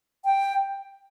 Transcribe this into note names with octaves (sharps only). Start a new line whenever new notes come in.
G5